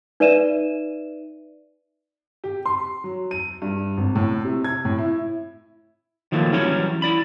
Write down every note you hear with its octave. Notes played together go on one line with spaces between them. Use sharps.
D#4 B4 D5 E5 D#7 E7
G4
C6
F#3
D#7
G2
G#1
A2
C3
G#6
A2
E4
D#3 F3 F#3 A3 A#3
E3 F#3 G3 C#4 E4 C#5
E4 D5 B5